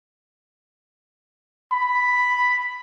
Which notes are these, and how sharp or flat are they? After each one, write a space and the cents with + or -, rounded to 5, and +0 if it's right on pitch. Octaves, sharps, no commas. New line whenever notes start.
B5 +0